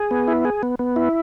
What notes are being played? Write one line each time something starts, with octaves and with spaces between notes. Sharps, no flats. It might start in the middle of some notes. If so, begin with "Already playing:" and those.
Already playing: G#4
B3
E4
G#4
B3
B3
E4